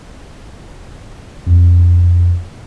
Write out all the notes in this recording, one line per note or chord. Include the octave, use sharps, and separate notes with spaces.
F2